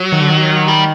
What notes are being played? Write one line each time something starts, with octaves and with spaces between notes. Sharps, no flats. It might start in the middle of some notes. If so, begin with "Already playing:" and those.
Already playing: F#3
D#3
D3
D#3
G3